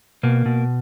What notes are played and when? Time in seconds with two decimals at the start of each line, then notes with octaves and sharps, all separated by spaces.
0.23 B2 A#3
0.46 B2